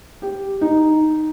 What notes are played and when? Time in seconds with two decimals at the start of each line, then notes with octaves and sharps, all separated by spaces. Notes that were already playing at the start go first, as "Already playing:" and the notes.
0.22 G4
0.61 D#4